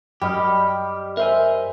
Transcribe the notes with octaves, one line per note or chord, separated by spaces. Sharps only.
F#2 G3 G4 D#5 F6
A#4 C5 E5 G#5